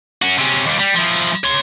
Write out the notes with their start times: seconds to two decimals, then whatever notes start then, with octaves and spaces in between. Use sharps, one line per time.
0.22 C#4 F#4
0.38 C3 C#4
0.66 D#2 G3
0.80 G3
0.95 F3 E4
1.44 C#5 C6